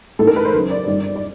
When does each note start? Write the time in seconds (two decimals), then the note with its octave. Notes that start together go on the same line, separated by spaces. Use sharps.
0.19 A1 G#2 E3 A3 A4
0.27 A#4
0.36 B4
0.45 C5
0.53 D#2 C#3 F#3
0.70 D5
0.87 G1 G2 D#3 G3
1.16 D5